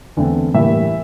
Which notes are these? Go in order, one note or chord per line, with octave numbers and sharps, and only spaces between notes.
E2 D3 A3 C4
A2 E3 G3 A#3 E5